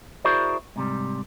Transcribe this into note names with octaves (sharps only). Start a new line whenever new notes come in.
E4 F#4 G#4 A#4 C5 D5
G#2 C3 G3